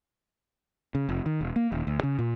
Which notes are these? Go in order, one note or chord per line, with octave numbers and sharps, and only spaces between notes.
C#3
F1
D#3
E1
A#3
D#1
D2
C#3
A#2